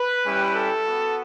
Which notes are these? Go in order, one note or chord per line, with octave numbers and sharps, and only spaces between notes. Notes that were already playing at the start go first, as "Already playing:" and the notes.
Already playing: B4
G3 C#4 E4 G4
A4
B3 F#4